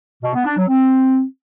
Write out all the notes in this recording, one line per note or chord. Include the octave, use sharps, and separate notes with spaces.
B2
B3
D4
F#3
C4